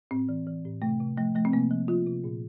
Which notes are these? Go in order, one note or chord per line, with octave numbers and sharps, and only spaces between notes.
A2 C4
E3
E3
A2
C3 A3
C3
F3 A3
F3 A3
C4
C3 A#3
F3
F3 F4
C3
A#2